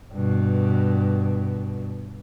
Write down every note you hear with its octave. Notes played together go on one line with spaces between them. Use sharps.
G2 B2